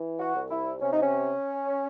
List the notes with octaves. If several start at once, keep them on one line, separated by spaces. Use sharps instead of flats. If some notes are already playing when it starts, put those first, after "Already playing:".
Already playing: E3
F#4
C2
E4
C3 C#4
D#4
C#4